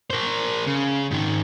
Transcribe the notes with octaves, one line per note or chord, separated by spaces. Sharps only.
A#4 C5
C#3
G#2 D#3